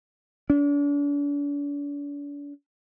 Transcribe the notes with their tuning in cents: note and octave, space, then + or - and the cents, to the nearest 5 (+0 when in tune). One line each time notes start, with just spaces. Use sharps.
D4 -40